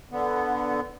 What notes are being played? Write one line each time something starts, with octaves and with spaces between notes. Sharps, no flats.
D3 B3